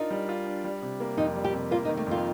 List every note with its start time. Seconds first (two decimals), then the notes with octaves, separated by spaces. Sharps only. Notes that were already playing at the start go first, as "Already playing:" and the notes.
Already playing: D4 D#4 F4 A#4
0.11 G3
0.29 F4
0.46 D4
0.64 G3
0.82 C3
1.00 A#3
1.17 F2 D#4
1.36 G3
1.44 G4
1.53 C3
1.71 A#3 F4
1.85 D#4
1.89 D#3
1.97 A3
2.07 F2 F4